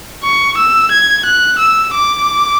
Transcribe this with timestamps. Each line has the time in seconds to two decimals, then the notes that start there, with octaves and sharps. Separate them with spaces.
0.23 C#6
0.57 E6
0.91 G#6
1.25 F#6
1.59 E6
1.94 D6